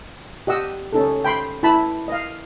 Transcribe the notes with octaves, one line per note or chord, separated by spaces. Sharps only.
G4 D#5 F#5 E6
C#4 D#4 A4
G5 B5 C6
E4 A5 B5
D#5 F5